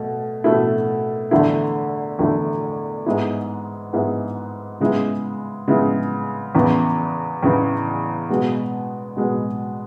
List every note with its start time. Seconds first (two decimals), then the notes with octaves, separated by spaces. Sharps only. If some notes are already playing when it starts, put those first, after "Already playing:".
Already playing: B2 A3
0.44 B2 A3 E4
1.31 E2 D3 A3 E4
2.19 E2 D3 A3 E4
3.06 G#2 G#3 B3 E4
3.93 G#2 G#3 B3 E4
4.80 C#3 G#3 B3 E4
5.68 C#3 G#3 B3 E4
6.55 E2 C#3 E3 B3
7.43 E2 C#3 E3 B3
8.29 B2 G#3 B3
9.17 B2 G#3 B3